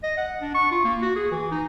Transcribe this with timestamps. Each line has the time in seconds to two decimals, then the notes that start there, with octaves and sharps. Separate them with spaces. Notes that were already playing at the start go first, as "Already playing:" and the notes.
0.03 D#5
0.18 F#5
0.41 D4
0.55 C#6
0.72 F4
0.85 A#3
1.02 F#4
1.16 G#4
1.31 E3
1.51 D#4